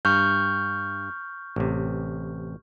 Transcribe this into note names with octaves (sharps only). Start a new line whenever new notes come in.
G2 C#6 F6 G6
A1 C3